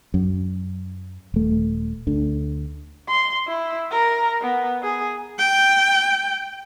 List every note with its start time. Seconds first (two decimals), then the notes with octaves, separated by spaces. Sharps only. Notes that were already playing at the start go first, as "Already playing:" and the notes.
0.14 F#2
1.34 D#1 A3
2.07 D2 D3
3.09 C6
3.48 E4
3.92 A#4
4.42 B3
4.83 G#4
5.39 G5